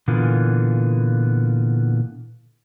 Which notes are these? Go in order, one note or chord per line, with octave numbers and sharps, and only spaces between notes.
A#2 D3 E3 B3 F4